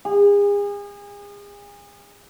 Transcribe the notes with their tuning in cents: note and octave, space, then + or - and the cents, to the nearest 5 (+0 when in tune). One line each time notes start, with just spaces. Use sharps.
G#4 -35